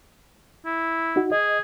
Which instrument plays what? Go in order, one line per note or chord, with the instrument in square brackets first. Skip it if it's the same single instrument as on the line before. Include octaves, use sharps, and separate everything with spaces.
[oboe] E4
[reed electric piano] D#4 F#4
[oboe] G#4 [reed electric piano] D#5